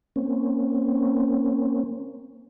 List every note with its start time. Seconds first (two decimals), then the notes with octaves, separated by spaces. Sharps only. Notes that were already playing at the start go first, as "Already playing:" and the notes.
0.16 A#3 C4 C#4